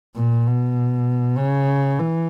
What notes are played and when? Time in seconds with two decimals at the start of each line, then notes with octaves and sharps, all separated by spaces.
0.16 A#2
0.47 B2
1.38 C#3
1.99 E3